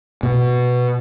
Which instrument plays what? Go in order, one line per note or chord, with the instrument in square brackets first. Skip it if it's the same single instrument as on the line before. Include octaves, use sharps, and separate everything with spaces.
[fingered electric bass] B2